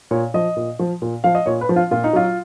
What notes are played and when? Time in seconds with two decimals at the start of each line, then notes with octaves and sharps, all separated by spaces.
0.11 A#2 C#5
0.34 F3 D#5
0.56 A#2
0.79 F3
1.02 A#2
1.24 F3 F5
1.35 D#5
1.46 A#2 C#5
1.61 B4
1.69 F3
1.76 F4
1.91 A#2 F4
2.04 D#4
2.13 F#3 F4